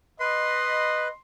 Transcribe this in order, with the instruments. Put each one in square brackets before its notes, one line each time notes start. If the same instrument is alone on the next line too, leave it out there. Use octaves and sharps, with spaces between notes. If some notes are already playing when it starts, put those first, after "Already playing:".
[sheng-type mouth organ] B4 [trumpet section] D#5 B5 [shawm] C6